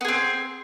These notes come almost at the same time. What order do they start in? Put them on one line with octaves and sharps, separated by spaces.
B3 G#4 C4